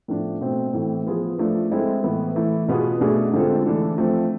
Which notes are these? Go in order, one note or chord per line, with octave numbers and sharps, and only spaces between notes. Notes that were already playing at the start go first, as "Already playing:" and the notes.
A2 F3 B3 D4
B2 A3 C4
A2 E3 A3 C4
F3 B3 F4 G#4
F3 A3 D4 F4 A4
G#3 C4 E4 A4
A2 E3 B3
E3 A3 E4
B2 B3 F4 G#4
B2 A3 D4 G#4
D3 G#3 C4 F4 A4
E3 A3 D4 A4
F3 A3 C4